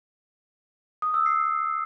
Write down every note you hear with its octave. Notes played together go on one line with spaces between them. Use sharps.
D#6
E6
C7